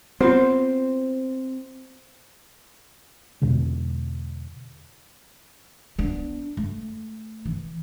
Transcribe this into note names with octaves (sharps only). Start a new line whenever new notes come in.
B3 C4 F4 C5
E2 B2 D3 G#3
B3 D4
A3
E3